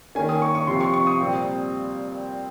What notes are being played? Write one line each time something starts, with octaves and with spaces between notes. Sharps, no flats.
D#3 A#3 C#4 G#5
D#6
C#6
C#6
C3 F3 C4 C6
C#6
C#6
D#6
A#2 G3 C4